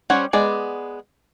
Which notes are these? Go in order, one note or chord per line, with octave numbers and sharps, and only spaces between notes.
G3 C#4 C5 C#5 F#5
G#3 B3 G#4 D5